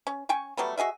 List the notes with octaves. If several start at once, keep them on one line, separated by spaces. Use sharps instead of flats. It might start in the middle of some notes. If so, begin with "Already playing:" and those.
C#4
C#4 G5 G#5 C#6
F#3 G3 A3 B3
F#4 G#4 D#5 E5